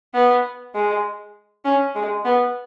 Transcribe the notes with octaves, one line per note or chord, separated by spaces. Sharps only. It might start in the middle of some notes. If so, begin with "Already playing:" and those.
B3
G#3
C#4
G#3
B3